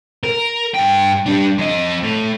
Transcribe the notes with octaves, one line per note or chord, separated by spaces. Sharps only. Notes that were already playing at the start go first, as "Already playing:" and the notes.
A#4
G2 G5
G3 D4
F2 D#5
A2